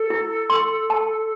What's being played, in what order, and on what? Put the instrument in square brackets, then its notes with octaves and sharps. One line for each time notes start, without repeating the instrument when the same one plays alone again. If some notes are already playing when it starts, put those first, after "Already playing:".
Already playing: [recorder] A4
[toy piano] E4
C6
A5